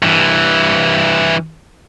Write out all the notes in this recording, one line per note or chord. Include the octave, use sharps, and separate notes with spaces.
G2 E3